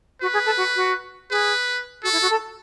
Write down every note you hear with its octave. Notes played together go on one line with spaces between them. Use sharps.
F#4 B4
G#4
A4
F#4
F#4
G#4 B4
F#4 A4
E4
F#4
A4